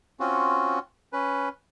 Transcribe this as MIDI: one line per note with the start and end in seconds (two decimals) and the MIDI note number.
0.20 0.79 60
0.20 0.79 61
0.20 0.79 65
0.20 0.79 66
1.13 1.49 61
1.13 1.49 71